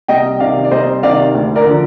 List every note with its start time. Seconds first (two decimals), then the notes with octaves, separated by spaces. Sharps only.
0.08 C2 D#5 G5
0.40 C3 D#3 D5 F5
0.65 D5
0.71 C2 C5 D#5
1.03 C3 D#3 D5 F5
1.35 D2
1.56 A#4 D5
1.66 D3 F3